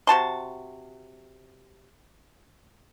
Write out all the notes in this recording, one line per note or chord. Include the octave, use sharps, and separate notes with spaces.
C3 F#4 A5 C6